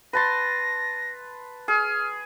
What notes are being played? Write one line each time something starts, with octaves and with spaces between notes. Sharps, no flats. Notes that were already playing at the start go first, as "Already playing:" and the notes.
B4 A5 C6 A#6
G#4 F6